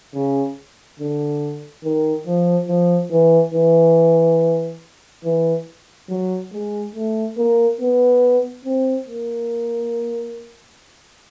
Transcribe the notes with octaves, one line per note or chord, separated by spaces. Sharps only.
C#3
D3
D#3
F3
F3
E3
E3
E3
F#3
G#3
A3
A#3
B3
C4
A#3